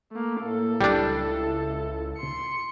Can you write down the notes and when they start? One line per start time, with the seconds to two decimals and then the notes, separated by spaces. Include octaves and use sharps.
0.12 A3 A#3
0.42 A2 A#3 A4
0.81 C#2 G3 D4 E4
2.18 C6 C#7